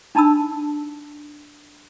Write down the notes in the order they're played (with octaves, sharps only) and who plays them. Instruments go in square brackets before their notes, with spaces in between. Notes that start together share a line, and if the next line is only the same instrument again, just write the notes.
[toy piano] D4 D#4 A5 B5 E6